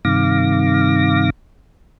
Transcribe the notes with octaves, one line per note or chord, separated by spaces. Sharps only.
G2 C3 D#3 F5 D6 A#6